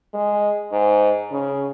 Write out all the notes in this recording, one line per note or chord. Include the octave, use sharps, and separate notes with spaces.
G#3
G#2
C#3